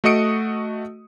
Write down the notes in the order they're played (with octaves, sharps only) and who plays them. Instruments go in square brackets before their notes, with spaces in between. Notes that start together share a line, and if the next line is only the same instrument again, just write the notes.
[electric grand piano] A3 F#4 D#5 D#6 C#7 D7